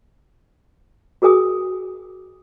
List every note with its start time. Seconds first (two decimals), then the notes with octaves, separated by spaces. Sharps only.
1.22 F#4 G#4 A#4 G#5 D#6